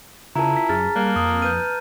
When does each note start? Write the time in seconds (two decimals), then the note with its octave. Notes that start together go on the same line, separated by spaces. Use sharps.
0.36 C#3 E4 F4 A#4 A5 A#5
0.56 B6
0.69 F#2 G#4 F6 A6
0.96 G3 A#3 F#6
1.16 F2 D#6 F6
1.42 B4 F6 G6 D#7